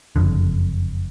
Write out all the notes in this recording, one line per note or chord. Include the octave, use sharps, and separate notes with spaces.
F#1 B1 F2 D3